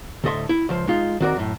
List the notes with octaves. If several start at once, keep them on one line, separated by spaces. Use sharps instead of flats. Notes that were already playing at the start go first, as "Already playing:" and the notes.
D2 A2 A4 D#5 E5 C6
E4
C#2 F3 C5
G#3 D#4 F4
D#3 C4 F#4 A#4 D5
F#2 A2